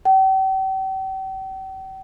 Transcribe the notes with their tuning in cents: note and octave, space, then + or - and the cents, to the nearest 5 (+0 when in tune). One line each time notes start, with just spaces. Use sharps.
G5 -40